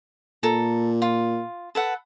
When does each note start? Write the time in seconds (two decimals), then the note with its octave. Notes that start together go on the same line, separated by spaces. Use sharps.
0.43 A#2 A4 A#5
1.02 F4
1.75 A4 B4 F#5